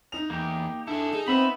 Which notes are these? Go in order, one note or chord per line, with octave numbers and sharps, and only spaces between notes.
D#4 F7
E2 A#3 G4
D4 E4 G#4 A4
D#4 G#4
B3 C4 E5 B5